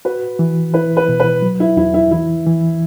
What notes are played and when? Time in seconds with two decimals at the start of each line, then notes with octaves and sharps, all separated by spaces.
0.05 F#4 B4
0.39 E3
0.74 E4 B4
0.97 B4
1.09 B2
1.20 B4
1.42 F#3
1.60 E4
1.77 E2 E4
1.94 E4
2.11 E3 E4
2.46 E3